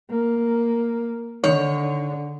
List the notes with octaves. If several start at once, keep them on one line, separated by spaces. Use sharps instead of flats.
A#3
D3 D#3 C#5